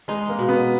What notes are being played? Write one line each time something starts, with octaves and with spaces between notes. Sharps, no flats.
G#3 D#4
A#3
B2
B3